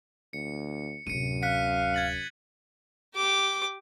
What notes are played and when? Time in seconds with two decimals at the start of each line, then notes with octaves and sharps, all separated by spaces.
0.33 D2 C#7
1.07 D1 F#2 C3 C#7 D#7
1.43 F5 F#6 B6 C#7
1.94 G#6 A6 F#7
3.16 G4 D6